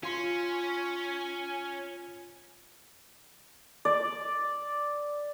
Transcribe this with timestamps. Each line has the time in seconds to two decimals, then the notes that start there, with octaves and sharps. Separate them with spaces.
0.03 C#4 F4 C6
3.85 D5